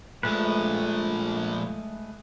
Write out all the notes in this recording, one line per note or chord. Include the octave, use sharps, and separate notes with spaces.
A#2 F3 G#3 A3 B4